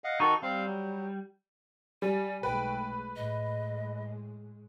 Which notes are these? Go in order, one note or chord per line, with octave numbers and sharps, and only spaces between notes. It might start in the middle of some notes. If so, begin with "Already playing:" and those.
D#5 F5 F#5
D#3 D#4 F#4 A4 C#6
G3 C4 F5
F#3
G3 G#5
B1 G#3 A3 B4 G5
A2 G#3 D#5